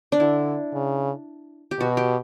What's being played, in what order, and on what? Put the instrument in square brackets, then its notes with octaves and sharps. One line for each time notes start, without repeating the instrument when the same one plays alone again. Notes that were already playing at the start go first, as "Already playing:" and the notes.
[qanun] D4
[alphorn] D3 [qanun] E4
[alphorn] C#3
[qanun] G4
[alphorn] B2 [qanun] F#4
[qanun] G4